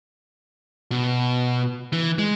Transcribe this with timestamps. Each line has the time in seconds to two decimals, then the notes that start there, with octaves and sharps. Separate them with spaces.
0.91 B2
1.93 E3
2.18 G#3